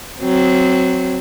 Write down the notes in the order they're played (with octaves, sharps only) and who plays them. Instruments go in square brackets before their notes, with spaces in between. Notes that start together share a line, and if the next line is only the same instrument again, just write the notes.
[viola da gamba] F#3 C4